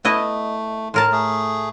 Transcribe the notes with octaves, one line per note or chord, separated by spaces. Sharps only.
A3 B3 E4 D#5
A2 A#4 A5 C6
A3 G#4